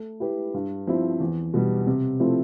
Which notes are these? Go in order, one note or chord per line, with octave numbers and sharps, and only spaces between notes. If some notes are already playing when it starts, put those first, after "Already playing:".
Already playing: A3
E4 G4 B4
G2
F3 C4 E4
E2
B2 G3
C3
F3 A3 C4 E4